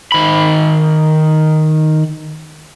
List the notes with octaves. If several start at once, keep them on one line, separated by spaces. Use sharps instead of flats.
D#3 B5